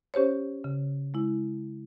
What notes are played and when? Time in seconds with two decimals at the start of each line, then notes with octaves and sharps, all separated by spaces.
0.14 C#4 G4 C5 C#5
0.64 C#3
1.14 G#3 E4